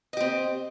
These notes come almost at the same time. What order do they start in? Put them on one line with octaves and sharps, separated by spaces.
D#5 G4 C4